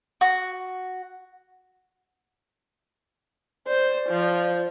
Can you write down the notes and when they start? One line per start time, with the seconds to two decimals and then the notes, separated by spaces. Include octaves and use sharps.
0.21 F#4
3.67 C5 D5
4.09 F3